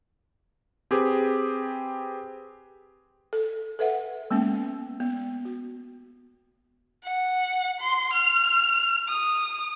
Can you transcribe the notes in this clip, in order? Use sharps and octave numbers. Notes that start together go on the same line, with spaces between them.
C4 G4 G#4 B4
A4
A4 B4 E5 F#5
G#3 A#3 B3 C#4
B3
F#4
F#5
C6
F6
D#6